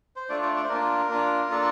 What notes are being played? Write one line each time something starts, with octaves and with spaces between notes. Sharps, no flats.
C5
A3 D4 F4 D5
D5
D5
C5
A#3 D4 F4 A#4
A#3 D4 F4
A#3 D4 F4 A4